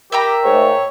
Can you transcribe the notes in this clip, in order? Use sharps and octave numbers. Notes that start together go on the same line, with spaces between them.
G4 A#4 E5 G5 A#5
G#2 A3 C#5